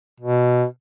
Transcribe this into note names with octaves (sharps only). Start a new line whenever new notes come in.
B2